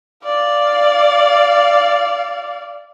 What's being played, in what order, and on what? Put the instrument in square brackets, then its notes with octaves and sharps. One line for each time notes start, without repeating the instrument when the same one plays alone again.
[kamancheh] D5 F5